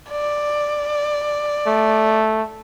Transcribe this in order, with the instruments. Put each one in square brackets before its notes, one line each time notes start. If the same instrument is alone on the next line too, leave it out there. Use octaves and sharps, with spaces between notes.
[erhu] D5
[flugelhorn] A3